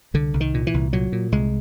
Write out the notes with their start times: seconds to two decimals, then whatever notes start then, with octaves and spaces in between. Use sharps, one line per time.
0.14 C2 D3
0.34 C2
0.40 D#3
0.54 A#2
0.67 E3
0.74 C2
0.93 A#2 F#3
1.12 A#2
1.32 C2 G#3